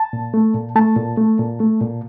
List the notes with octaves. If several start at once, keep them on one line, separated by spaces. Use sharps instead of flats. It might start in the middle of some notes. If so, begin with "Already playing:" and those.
Already playing: A5
A#2
A3
A#2
A3 A5
A#2
A3
A#2
A3
A#2